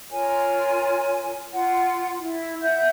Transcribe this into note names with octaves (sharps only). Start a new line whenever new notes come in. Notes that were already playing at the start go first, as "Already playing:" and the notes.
F4 A#4 C#5 G#5
F4 F#5
E4
E5 F#5 G6